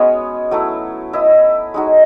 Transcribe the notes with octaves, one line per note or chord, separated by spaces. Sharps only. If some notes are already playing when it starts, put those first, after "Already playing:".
Already playing: G#3 B3 C#4 F#4 C#5
F#3 A3 E4
E4 B4 D#5
G#3 D#4 F#4